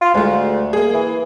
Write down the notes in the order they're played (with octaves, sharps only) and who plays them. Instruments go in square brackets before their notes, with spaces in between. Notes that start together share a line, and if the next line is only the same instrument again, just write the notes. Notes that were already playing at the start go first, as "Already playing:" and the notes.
[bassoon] F4
[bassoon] D2 [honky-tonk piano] G#3 A3
[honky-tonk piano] A#3 G#4
[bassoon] E3